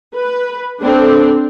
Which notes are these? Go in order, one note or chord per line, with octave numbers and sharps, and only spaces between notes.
B4
C4 D4 A4